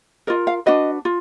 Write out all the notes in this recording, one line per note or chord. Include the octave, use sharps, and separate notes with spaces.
F4 A#4 D#5
F5
D4 F#4 B4 D#5
F4